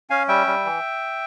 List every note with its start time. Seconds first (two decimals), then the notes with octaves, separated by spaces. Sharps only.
0.10 C#4 F5 G#5
0.28 G3 E5 G5
0.47 G3
0.65 E3